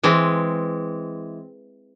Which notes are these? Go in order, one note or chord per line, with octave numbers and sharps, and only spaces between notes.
E3 G#3 C4